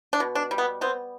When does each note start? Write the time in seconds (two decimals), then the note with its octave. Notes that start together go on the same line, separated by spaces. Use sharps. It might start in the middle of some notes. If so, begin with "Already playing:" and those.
0.13 D4
0.20 B2
0.35 D4
0.51 G3
0.58 B3
0.81 B3 C4